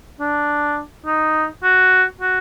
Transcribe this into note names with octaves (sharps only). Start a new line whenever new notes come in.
D4
D#4
F#4
F#4